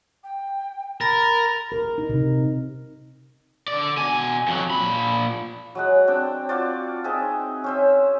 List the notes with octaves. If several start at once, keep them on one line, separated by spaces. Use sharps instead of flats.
G5
A#4 B5 A6 A#6
A#4
D#4
C3
D3 D5
B2 G#5
F2 F#3
A#2 B5
F#3 G#3 F#5
C4 D4 G5
F4 F#4 C5 D5
C4 D#4 G#4 E5
C#4 C5 E5